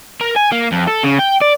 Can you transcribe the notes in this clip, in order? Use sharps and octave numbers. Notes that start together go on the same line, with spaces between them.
A#4
G#5
A#3
F2
A4
C#3
G5
D5